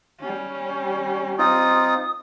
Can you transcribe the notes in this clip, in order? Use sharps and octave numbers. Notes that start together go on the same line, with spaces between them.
G3 C#4
C4 D#4 F4 D#6